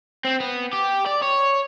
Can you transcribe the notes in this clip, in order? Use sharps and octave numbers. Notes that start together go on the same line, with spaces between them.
C4
B3
G4
D5
C#5